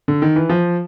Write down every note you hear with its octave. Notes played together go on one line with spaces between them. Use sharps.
D3
D#3
E3
F3